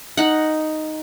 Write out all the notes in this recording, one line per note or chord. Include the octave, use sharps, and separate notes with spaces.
D#4 F#5